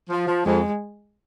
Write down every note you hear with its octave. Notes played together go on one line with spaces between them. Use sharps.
F3
F3
F2 G#3